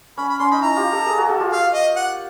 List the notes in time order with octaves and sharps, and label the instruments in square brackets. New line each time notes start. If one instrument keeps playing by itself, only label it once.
[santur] C#4 [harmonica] B5
[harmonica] B5
[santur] C#4 [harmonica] C6
[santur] D#4 [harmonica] B5
[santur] E4 [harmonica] A#5
[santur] F4 G4
G4 A4
G#4 A#4
F#4 G#4
F#4 G#4
F4 G4
[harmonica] F5
D#5
F#5